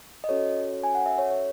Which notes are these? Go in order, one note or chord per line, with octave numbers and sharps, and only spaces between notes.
D#5
C#4 F#4 A4 C#5
G#5
F#5
E5
C#5
C#5